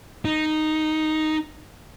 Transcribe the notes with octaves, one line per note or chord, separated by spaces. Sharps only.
D#4